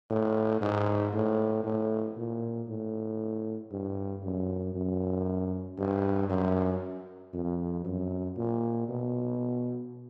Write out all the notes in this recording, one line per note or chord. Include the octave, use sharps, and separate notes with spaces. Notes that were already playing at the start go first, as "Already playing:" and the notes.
A2
G#2
A2
A2
A#2
A2
G2
F#2
F#2
G2
F#2
F2
F#2
A#2
B2